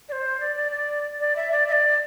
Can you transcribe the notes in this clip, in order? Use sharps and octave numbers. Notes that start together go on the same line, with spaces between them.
D5
C5
D5
D5
D5
D5
E5
D5
E5
D5